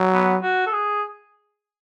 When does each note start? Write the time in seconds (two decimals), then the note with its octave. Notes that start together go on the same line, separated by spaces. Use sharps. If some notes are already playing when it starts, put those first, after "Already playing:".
Already playing: F#3
0.13 B3
0.42 F#4
0.67 A4
0.72 G#4